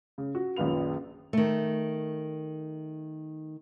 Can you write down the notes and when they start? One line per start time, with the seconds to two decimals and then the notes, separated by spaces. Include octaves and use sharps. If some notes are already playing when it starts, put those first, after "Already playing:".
0.18 C#3
0.35 F#4
0.56 A#1 F#2 D#3 F4 B4 F7
1.33 D#3 A3